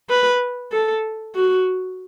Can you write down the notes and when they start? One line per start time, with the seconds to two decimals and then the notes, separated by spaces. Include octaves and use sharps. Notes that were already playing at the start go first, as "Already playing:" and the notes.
0.09 B4
0.72 A4
1.36 F#4